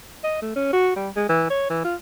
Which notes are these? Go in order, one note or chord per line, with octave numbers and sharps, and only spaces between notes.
D#5
A3
C#4
F#4
G3
G#3
E3
C#5
E3
F4